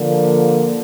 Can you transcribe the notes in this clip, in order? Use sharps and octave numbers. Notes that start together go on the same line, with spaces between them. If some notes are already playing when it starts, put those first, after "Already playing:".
Already playing: D3 F3 A#3